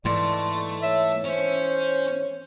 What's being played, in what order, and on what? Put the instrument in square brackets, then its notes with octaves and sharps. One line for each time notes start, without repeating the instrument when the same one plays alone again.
[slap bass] G#2 E3 [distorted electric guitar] A3 [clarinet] D5 [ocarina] C6
[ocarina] C#5 [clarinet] E5
[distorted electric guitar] C#4 [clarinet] C5